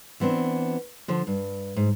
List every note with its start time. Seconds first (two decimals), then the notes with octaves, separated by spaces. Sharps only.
0.20 E3 B3 C4 D4
1.08 D3 F3
1.27 G2
1.76 G#2